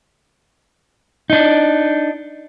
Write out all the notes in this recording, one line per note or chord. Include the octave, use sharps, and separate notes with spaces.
D4 D#4